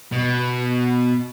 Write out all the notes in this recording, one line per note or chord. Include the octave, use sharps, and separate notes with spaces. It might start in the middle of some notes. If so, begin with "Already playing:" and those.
B2